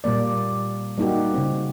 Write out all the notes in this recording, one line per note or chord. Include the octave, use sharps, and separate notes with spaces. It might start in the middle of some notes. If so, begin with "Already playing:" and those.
A#2 G3 A#3 D5
G3 A#3 D#4 F#4 G4
C#3 C4